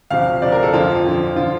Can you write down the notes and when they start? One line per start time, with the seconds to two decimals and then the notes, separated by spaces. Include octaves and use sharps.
0.10 D2 C3 F3 F5
0.42 D2 C3 F3 D5
0.52 A#4
0.63 A4
0.73 F2 D3 F3 F4
1.05 F2 D3 F3
1.36 D3 F3 F4